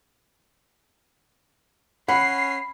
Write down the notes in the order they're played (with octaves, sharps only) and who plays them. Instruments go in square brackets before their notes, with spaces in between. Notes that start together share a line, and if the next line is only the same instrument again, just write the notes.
[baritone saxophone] C#4 [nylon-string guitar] F#5 [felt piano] B5 [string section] C7